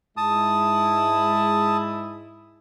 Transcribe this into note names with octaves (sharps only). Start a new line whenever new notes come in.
G#2 G#3 E4 A5 D#6